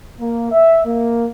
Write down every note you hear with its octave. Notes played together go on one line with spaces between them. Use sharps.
A#3
E5
A#3